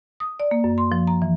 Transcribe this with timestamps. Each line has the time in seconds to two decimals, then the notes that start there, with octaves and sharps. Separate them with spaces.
0.20 D#6
0.40 D5
0.51 A#3
0.64 F#2
0.78 C6
0.92 F3
1.07 A#5
1.22 E3